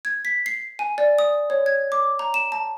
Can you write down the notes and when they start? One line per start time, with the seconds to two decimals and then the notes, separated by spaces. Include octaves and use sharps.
0.05 G#6
0.25 B6
0.46 C7
0.79 G#5
0.98 D5
1.19 D#6
1.50 C#5
1.66 G#6
1.92 D6
2.19 A#5
2.34 E7
2.52 A5